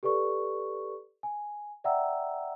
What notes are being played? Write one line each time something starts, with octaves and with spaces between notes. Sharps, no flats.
G4 A4 B4 D5 C#6
G#5
D5 E5 F#5 G5 A#5 E6